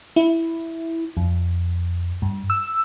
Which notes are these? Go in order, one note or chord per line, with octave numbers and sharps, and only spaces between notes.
E4
F2
G2
E6